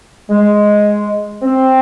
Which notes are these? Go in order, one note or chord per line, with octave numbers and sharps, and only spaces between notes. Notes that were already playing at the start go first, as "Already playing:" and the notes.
G#3
C4